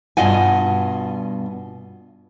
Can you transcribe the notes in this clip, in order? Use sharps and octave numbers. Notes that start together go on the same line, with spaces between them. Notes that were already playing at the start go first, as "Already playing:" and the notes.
G2 B2 F4 D#5 F#5 G#5